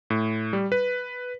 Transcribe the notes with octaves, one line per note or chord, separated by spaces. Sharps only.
A2
G3
B4